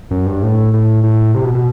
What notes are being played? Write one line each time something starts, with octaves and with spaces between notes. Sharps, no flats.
F#2
G2
A2
A2
A2
C3
B2
B2